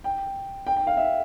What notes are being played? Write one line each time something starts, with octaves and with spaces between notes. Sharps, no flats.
G5
G5
G5
F5
E5